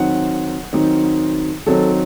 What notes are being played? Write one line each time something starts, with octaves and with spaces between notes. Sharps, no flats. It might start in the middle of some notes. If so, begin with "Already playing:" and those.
Already playing: D#3 F#3 C4 D#4 F#5
D#3 F#3 C4 D#4
D#3 F#3 C4 D#4 A4